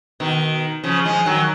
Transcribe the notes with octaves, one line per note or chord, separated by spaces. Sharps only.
B2 D#3
C#3 F3
F3 G#3
D#3 F#3